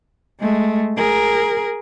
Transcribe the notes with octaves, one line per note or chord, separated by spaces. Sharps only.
G#3 A3
G#4 A#4